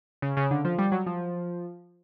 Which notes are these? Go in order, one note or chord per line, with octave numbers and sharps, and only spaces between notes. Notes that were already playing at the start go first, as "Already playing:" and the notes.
C#3
C#3
D3
F3
G3
F#3
F3